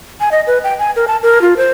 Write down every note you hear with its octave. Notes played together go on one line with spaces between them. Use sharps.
G#5
D#5
B4
G5
G#5
A#4
A5
A#4
F4
C5